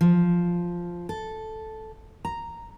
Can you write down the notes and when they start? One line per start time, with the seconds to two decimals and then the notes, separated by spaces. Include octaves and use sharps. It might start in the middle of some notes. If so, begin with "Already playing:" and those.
0.01 F3
1.09 A4
2.25 A#5